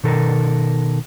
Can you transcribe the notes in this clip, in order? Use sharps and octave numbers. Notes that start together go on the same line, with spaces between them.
B2 D#3 A4 A#4